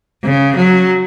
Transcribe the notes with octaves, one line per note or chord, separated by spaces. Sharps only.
C#3
F#3